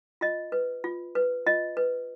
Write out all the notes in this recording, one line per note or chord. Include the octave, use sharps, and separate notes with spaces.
F4 D#5
B4
F4
B4
F4 D#5
B4